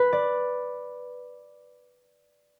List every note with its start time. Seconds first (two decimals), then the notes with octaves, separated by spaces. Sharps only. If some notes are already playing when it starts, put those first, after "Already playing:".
Already playing: B4
0.13 D5